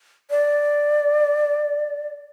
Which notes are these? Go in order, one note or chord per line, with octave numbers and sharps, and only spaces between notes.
D5